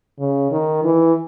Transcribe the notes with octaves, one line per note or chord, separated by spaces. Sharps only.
C#3
D#3
E3